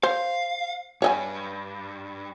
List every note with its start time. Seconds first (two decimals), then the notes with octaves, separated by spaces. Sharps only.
0.03 C5 F5
1.02 G2 C#5 D#5 G#5